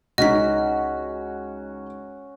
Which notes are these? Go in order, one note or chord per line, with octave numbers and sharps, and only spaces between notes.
C#2 C#4 D#4 F#4 D#5 B6